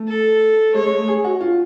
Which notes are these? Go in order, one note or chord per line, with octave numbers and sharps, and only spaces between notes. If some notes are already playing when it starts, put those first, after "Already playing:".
Already playing: A3
A4
G#3 C#5
G#3
A3
G#4
F#4
F4